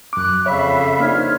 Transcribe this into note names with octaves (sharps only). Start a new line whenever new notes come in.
F#2 D6 F#6
F2 C#3 C#5 E5 F5 B5
A#3 D4 D#4 C5 C#5 F6